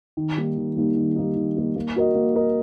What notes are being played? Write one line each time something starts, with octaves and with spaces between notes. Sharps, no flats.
D#3
G3 A#3 D#4
D#3
G3 A#3 D#4
D#3
G3 A#3 D#4
D#3
G3 A#3 D#4
A#3
F#4 A#4 D#5
A#3
F#4 A#4 D#5